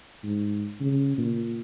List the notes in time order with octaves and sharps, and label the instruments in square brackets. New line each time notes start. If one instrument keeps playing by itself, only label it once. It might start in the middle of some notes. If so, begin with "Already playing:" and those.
[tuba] G#2
C#3
A#2